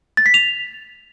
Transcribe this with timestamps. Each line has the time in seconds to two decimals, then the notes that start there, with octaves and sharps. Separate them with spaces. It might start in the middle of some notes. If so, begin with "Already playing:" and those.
0.17 A6
0.26 B6
0.34 F7